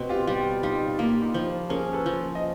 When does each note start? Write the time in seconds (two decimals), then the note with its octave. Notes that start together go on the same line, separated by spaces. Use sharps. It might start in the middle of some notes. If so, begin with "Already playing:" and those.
Already playing: B2 C4
0.09 F4 G4
0.27 G3 F4 G4
0.63 G3 D#4 F4
0.98 A#3 F4 G4
1.22 D#4 F4
1.34 F3
1.69 C#4 G#4 A#4
1.93 A4 B4
2.06 F3
2.35 D#5